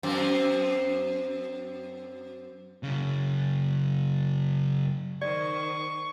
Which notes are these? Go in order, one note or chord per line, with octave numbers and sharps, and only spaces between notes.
F#2 C4
F#2 C#3
D#3 C5 D5 C#6